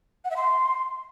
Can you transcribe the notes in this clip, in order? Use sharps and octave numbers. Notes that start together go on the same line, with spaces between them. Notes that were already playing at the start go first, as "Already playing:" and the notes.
F#5
E5
C6